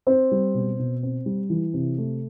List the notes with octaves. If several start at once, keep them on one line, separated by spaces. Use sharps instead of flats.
C4 C5
G3
B2
B2
C4
G3
E3
C3
A3